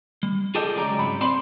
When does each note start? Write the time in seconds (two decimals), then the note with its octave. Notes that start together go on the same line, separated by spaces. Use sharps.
0.23 G3
0.55 F4 G#4 A4 D5 D#5 G5
0.76 C#2 F#3 G#3 D5 A#5
0.99 C2 G#2 F#3 B5
1.21 C4 D5 B5 C6